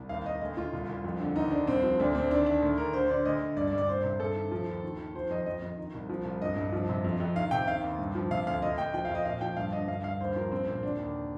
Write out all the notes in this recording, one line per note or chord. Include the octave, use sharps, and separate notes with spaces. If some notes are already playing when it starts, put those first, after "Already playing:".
Already playing: C2
D#2 F5
D#2 D#5
D2 D#5
D2 F4
C2
C2
F2
D3
D#2 D#4
D#2 D4
C2 C4
F3
D2 D4
D2 C4
D#3 D4
D#3 D4
D2
D2 A#4
D3 C5
D3 D5
D2 D#5
D2
G2 D5
D5
G2
D5
C2 C5
C3
G2 A4
D#3
F3
D#2
D#3
D#3
F3 C5
F2 D#5
F2 D#5
F2
D#3
C2
F3
C2
G2 D#5
G2
F3
C3
F2
F2
D#3 F5
C3 G5
D#3 F5
D#2
G2
F3
C3 F5
D2 F5
D2 D#5
D2 G5
F3 G5
F2 F5
D#5
A#2 F5
F3 G5
G2 F5
D3 D#5
G2 F5
G2 F5
D#2 C5
F3 A#4
C2 C4
A#2 C4
D3 D4
D#2